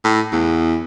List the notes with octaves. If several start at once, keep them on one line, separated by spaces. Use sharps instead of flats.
A2
E2